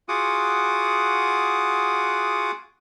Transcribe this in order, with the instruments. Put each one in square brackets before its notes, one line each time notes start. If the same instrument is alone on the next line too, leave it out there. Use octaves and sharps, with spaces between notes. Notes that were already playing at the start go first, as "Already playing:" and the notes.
[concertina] F4 F#4 G#4 F#5 D6 D#6